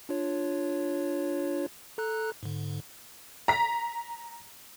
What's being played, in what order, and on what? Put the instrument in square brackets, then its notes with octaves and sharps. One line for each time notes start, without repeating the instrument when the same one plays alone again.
[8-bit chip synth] D4 F4 C#5
A4 A#5 F#6
G#2 D3
[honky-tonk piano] A#5 B6